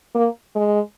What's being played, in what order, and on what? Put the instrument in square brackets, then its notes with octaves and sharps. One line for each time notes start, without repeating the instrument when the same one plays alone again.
[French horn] A#3
G#3